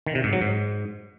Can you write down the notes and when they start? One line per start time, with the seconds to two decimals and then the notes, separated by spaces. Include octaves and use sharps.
0.06 D#3
0.15 C3
0.24 G#2
0.33 F#3
0.41 G#2